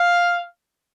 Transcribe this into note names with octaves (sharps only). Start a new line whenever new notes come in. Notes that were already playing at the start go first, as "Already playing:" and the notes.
Already playing: F5